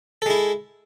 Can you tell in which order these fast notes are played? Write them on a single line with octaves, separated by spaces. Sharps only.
A4 G#3 E4